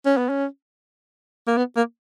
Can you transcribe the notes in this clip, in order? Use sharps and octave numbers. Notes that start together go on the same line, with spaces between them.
C#4
B3
C#4
A#3
B3
A#3